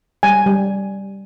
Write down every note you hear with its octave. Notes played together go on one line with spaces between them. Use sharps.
G3 G#5
G3